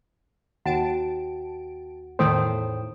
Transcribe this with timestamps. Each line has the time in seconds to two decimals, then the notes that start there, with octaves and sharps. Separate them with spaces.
0.66 D#2 F#4 F#5 G5 A5 D7
2.19 E2 A2 D#3 A3 C5 G5 D#6 D7